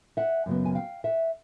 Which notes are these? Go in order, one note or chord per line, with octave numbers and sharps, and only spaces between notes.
E5 F#5
F#2 C#3 F#3 B3
G#5
F5 G5
E5 F#5